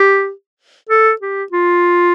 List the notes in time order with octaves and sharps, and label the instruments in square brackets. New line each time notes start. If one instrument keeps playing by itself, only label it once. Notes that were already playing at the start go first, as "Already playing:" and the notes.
Already playing: [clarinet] G4
A4
G4
F4